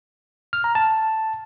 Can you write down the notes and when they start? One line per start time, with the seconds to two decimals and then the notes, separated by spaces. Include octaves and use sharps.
0.53 F6
0.64 A#5
0.75 A5